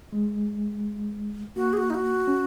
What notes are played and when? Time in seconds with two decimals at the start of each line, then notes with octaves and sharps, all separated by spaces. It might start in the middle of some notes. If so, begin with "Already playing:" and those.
0.13 G#3
1.56 A#3 F#4
1.73 G#4
1.77 F#4
1.90 D#4
1.94 F#4
2.28 C#4